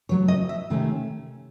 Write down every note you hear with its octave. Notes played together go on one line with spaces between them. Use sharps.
C#3 F#3 A3 C#5
D#5
E5
C3 D#3 A3 C#4